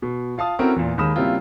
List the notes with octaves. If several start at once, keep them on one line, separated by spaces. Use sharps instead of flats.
B2
F4 F5 A5 D#6
C4 C#4 E4 F#4 A4 A#4
E2 A#2
D#2 D#3 G#3 B5 D#6 E7
C#3 G3 A#3 C4 E4 F4